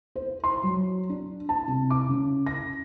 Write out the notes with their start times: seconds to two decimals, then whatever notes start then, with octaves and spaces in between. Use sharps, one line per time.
0.16 C5
0.44 C6
0.63 F#3
1.09 D4
1.49 A5
1.68 C3
1.90 D6
2.09 C#3
2.47 A#6